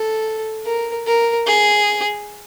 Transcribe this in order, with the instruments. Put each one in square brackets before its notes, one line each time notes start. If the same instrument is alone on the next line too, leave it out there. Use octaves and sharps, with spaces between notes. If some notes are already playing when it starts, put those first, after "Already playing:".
Already playing: [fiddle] A4
A#4
A#4
G#4